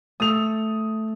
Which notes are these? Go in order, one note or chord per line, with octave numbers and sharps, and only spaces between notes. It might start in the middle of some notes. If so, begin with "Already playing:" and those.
A3 A4 D#6 F7